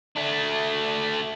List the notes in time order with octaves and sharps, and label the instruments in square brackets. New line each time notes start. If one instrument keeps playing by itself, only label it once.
[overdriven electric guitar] A3 D4